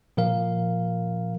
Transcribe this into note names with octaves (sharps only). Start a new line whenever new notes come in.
A#2 F3 A#4 F5